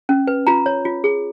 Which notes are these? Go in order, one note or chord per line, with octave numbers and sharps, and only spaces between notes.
C#4
B4
F4 A#5
C#5
F4
G#4